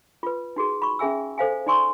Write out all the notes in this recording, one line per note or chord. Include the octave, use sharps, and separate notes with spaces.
F4 B4
D#4 F#4 G#4
B5 C#6
C#4 G#4 E5 G#5 E6
A4 C5 F5 G#5
D#4 D5 G#5 C6 C#6 E6